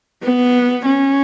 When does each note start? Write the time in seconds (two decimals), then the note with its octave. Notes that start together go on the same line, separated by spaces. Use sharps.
0.23 B3
0.86 C#4